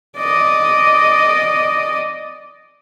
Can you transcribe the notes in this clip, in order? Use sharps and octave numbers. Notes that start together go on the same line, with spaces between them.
D5 D#5